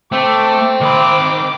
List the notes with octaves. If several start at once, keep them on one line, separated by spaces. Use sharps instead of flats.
A3 C4 D6
D#3 B5 D6